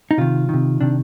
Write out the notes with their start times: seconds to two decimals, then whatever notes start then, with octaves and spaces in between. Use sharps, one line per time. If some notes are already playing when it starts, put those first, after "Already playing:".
0.11 D#4
0.18 C3 D#3 F4
0.49 C3 D#3
0.81 C3 D#3 D4